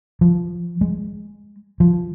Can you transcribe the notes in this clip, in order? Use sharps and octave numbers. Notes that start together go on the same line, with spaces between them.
F3
G#3
F3